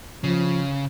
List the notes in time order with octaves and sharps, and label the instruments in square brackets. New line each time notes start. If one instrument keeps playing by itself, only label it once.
[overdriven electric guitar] C#3 [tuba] F3